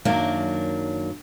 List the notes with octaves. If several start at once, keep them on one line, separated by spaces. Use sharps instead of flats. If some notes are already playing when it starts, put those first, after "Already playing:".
F#2 D#3 F#3 A#3 D4